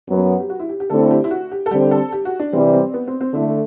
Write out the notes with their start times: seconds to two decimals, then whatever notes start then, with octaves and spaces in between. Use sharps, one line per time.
0.09 F#2 F#3 B3
0.40 G4
0.49 F#4
0.60 E4
0.69 G4
0.80 G4
0.90 D3 A3 C4 E4 A4
1.11 G4
1.24 E4
1.31 F#4
1.51 G4
1.66 A4
1.71 D3 G3 C4 G4
1.91 A4
2.12 G4
2.25 F#4
2.40 D4
2.53 C3 E3 G3 C4
2.73 C4
2.94 B3
3.07 C4
3.21 C4
3.34 D3 A3 E4